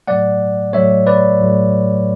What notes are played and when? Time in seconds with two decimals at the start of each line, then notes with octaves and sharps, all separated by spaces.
0.07 A2 F#3 A3 D5 F#5
0.73 A2 F#3 A3 C#5 E5
1.07 B4 D5
1.39 A2 F#3 A3